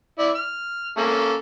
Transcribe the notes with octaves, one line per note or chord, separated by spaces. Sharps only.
E4 D5
F6
A#3 C#4 A4